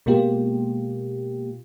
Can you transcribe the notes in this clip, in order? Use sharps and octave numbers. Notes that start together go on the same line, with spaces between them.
B2 G#3 A#3 F4 G4